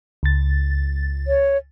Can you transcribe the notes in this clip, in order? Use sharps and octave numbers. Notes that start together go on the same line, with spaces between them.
C#2 A6
C#5